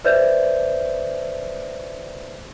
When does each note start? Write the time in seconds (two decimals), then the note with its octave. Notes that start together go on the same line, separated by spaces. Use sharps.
0.05 B4 C5 D5 E5 G6